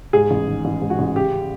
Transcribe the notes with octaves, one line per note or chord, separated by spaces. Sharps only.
G#2 G#4
A1
D#3
A1
G#2
F#4
A1
C#3 G4